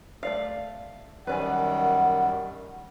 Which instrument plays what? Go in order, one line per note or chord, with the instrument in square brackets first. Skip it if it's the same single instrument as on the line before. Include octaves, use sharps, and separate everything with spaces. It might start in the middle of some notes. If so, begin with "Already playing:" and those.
[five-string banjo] A3 D5 F5
[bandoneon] F#2 D#3 G3 [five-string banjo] B4 D5 G#5 [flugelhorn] F#5